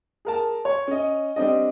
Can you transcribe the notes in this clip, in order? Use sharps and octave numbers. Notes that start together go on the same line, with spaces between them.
G#4 A#4 A5
C#5
C#4 D#5
G3 C4 D4 D#5